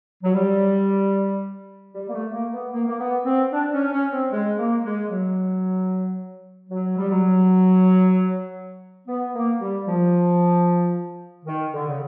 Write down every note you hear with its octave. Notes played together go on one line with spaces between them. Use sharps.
F#3
G3
G3
A#3
A3
A#3
B3
A#3
A#3
B3
C4
D4
C#4
C#4
C4
G#3
A#3
G#3
F#3
F#3
G3
F#3
B3
A#3
G3
F3
D#3
D3
C#3